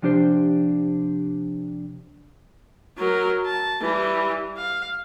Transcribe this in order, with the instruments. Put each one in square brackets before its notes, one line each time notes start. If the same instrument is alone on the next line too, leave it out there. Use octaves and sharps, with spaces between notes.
[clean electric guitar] C3 F3 D4 G4 C5
[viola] F#3 A#4
A5
E3 G3
F5